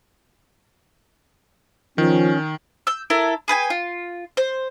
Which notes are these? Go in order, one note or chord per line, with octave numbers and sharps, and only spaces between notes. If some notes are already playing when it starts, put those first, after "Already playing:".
D#3 F3 C#4
E6 G6
E4 A4 A#4
G#4 B4 G5 G#5
F4
C5